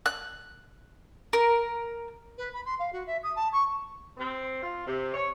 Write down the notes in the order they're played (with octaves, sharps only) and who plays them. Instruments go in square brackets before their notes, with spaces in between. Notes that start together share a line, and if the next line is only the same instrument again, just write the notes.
[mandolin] F#6
A#4
[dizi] B4
B5
C6
F5
F#4
E5
D#6
A5
C#6
[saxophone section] C4
F4
C3
C#5